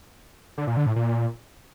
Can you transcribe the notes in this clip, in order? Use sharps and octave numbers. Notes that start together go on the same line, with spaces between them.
D3
A#2
D3
A2
A#2